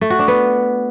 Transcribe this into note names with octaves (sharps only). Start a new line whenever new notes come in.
A3
F#4
D4
B3